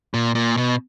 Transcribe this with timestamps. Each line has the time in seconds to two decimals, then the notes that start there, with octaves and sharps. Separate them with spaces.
0.14 A#2
0.35 A#2
0.57 B2